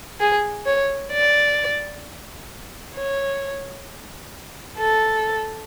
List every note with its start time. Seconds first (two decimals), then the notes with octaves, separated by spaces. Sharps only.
0.20 G#4
0.66 C#5
1.13 D5
2.95 C#5
4.78 A4